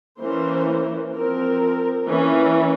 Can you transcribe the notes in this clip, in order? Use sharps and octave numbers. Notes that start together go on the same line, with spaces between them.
E3 A#3 C#4 C5
F3 C4 A#4
E3 A#3 C#4